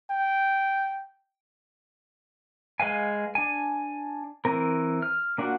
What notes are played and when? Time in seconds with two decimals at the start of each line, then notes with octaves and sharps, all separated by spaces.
0.10 G5
2.80 G#3 B4 F5 G#5
3.35 D4 G#5
4.45 E3 C4 A#4
5.02 F6
5.38 A#3 D4 F4 F#4 F#5